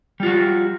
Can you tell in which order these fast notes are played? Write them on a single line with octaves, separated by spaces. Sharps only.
G3 F4 F#4